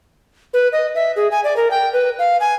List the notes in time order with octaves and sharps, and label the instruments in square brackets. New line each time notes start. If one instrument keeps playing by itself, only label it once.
[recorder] B4
D#5
E5
G#4
G#5
D5
A#4
G5
B4
F5
G#5